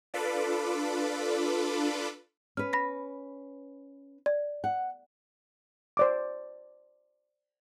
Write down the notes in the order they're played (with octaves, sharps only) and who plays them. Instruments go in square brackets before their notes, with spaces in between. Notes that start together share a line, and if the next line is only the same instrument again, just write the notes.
[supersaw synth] D4 F4 A4 B4 B5 D6
[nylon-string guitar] C#4 B4 [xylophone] F6
[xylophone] B5 A#6 B6
D5
[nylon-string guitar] F#5
[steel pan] C5 D5 D6